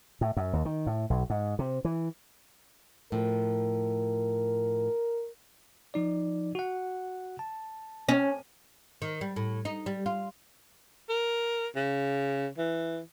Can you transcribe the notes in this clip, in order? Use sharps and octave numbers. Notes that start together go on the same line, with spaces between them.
A2
F#2
D#2
D#3
A2
B1
G#2
C3
E3
A2 F3 A#4
F3 D#4 D5
F#4 F#5
A5
C#4
D#3
G3
A2
D#4
G3
F4
A#4
C#3
E3